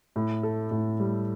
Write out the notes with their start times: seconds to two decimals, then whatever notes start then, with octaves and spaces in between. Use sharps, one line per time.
0.16 A2
0.43 A4
0.71 A2
1.00 G3